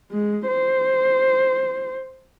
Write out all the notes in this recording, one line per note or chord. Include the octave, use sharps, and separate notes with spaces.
G#3
C5